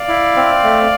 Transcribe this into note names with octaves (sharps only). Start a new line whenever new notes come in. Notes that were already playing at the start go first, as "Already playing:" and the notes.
Already playing: D5 F5
E4
C4
A3